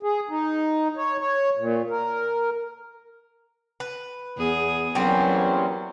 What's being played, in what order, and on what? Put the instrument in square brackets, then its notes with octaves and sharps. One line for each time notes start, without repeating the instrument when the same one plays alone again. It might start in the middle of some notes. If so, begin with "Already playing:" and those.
[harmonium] G#4
D#4
C#5
C#5
A#2
A#4
[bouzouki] B4
[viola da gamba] E2 G#4
[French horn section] E2 A#3 C#4 [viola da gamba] F#3 [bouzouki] G3 C4